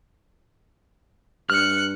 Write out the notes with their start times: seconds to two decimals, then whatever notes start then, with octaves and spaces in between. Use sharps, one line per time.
1.50 G2 F6 F#6 C#7